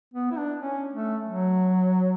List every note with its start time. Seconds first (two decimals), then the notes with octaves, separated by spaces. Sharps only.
0.14 B3
0.31 E4
0.37 D4
0.59 C#4
0.93 A3
1.27 F#3